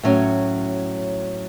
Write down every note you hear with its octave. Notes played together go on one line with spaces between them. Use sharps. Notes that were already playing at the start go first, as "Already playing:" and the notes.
A2 F#3 C#4